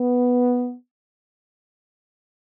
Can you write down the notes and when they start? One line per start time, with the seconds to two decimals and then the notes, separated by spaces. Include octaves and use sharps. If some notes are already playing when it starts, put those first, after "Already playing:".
Already playing: B3